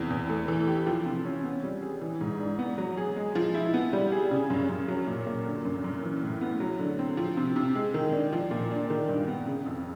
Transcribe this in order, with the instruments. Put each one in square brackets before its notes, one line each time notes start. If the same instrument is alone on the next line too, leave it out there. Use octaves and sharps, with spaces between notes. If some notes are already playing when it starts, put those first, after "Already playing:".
Already playing: [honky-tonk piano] E2 C3
E2
A3
E3
G4
F3
C3
C#4
B3
G3
G#4
E3
G#2
D4
B3
F#3
G#4
G#3
F3
E4
B3
G3
G#4
C#3
F#2
F#2
F#3
A#2
A#2
D3
F#2
F#2
E3
A2
B3
F#3
D3
C4
F3
C3
C3
G#3
D#3
D4
F3
A#2
D4
D#3
G2
B3
C#3
F2